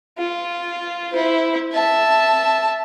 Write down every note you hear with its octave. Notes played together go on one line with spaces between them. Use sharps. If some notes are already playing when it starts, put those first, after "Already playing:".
F4
E4 C5
E5 A5